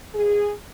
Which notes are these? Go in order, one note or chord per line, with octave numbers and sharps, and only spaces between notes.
B2 G#4